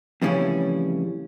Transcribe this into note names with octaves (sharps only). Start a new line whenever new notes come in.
F2 A2 C#3 E3 G3 C#4